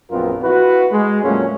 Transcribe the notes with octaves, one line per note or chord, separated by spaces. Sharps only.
A#1 F#2 B3 C4 F4 A#4
E4 F#4 B4
G#3
F2 A#2 F#3 A3 A#3 C#4